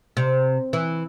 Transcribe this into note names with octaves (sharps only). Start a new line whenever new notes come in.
C3
E3